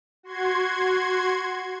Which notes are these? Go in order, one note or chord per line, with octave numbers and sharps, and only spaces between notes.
F#4 C6 G#6